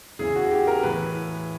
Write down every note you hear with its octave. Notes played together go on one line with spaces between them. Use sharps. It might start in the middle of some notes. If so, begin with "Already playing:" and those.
E2 C#3 E3 G#4
F#4
G4
A#4
A2 E3 B4